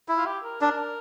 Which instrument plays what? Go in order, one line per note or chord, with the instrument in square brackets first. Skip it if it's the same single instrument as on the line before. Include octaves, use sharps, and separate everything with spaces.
[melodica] E4
[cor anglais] F4
G4
A#4
[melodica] D4 [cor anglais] A#4